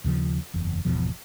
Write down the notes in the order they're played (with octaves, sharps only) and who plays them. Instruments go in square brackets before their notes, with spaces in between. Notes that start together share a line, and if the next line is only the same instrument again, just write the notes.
[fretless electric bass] D#2 C#3 F3
F#1 E2
G#1 E2 B2 F3